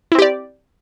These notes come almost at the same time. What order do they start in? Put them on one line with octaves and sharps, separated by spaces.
E4 C4 G4 D5